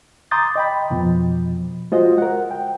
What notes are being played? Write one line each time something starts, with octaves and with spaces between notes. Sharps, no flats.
A#5 C6 D6 D#6 G6 A6
D#5 G5 B5
F2 B2 F3
G#3 F4 F#4 C5 D#5
A#4 F#5
G5